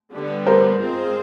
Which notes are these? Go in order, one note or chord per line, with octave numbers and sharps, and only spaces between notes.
D3 G3 B3
A#4 C5
G#3 C4 F4 G#4 C5